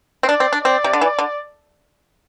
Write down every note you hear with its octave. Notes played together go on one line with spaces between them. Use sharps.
C4
D4 D5
C4
D4
C4 D5
C3
D3
E3
D3